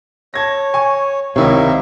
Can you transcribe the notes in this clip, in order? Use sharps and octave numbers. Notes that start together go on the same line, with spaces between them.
C#5 A5 G#6 A#6
G#5 C#6
C#2 C3 D#3 D#4 E4 C#5 F5 C#6